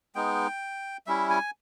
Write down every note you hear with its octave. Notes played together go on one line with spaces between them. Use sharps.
G#3 B3 D#4 G5
G3 C#4 E4 E5
G#5